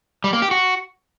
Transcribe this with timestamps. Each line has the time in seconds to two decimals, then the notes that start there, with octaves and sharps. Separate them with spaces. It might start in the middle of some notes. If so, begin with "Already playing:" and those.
0.24 G3
0.33 A#3
0.42 G4
0.51 F#4